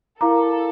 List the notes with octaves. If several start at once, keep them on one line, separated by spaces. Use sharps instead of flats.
E4 A4 A#4 F5 A#5 D6